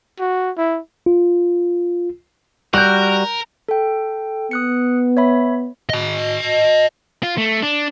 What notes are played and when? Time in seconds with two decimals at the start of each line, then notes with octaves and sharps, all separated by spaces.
0.20 F#4
0.58 E4
1.06 F4
2.74 G3 F#4 A#4 F#6 G6
3.69 A4 G5
4.51 B3 D#6 F#6 C#7
5.17 C#5 E5 B5
5.90 D#5 A5
7.23 F4
7.38 A3
7.62 D4